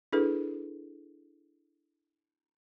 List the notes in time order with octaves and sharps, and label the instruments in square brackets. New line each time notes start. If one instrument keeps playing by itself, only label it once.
[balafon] D4 E4 G#4 A4 B4